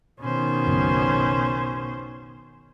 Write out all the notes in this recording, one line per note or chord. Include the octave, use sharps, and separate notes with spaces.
B2 D#3 C#4 C5
F#1 B1